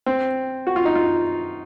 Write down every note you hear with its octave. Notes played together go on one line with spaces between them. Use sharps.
C4
F#4
F4
D#4
F4